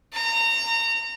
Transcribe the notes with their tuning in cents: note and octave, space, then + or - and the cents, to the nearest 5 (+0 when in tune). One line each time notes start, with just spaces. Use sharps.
A#5 -25